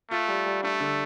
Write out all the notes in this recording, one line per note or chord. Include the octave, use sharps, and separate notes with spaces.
A3 F4
G3
G3
A3 D4
D3